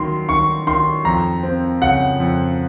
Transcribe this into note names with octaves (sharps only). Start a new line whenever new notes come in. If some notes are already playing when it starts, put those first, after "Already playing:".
Already playing: D#3 F#3 C6
D#3 C#6
D#3 C6
F2 A#5
C4
C#3 F#5
F2